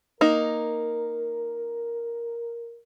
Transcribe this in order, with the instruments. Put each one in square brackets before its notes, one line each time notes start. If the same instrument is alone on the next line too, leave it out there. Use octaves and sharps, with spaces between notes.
[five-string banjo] A#3 D#4 [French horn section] A#4